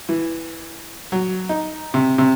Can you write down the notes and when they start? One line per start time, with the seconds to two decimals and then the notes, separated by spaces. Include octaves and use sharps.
0.09 E3
1.12 F#3
1.49 D#4
1.94 C3
2.18 C3